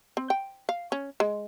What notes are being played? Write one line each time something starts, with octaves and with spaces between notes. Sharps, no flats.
C4
G5
F5
C#4
G#3